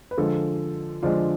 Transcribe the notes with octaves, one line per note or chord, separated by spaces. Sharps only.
B4
D3 F3 G#3 F4 A4
D3 F3 G#3 D4 F4